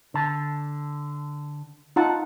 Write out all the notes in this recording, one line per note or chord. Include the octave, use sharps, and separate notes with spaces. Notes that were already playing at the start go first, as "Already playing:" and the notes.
D3 A5
D#4 F4 F#5 A5